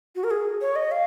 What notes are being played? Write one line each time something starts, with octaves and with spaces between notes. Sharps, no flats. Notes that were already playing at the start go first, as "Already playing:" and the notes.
F#4
A#4
G#4
C#5
D#5
F5